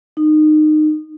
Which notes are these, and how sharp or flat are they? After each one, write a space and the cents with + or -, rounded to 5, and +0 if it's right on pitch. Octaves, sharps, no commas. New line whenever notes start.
D#4 -25